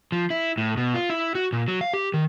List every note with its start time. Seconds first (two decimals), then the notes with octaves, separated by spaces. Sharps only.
0.12 F3
0.30 E4
0.58 A2
0.77 B2
0.94 F4
1.10 E4
1.35 F#4
1.53 A#2
1.68 F#3
1.81 F5
1.93 G4
2.14 D#3